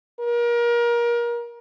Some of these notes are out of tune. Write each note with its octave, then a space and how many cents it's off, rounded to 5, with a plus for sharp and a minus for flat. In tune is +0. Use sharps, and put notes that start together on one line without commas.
A#4 +30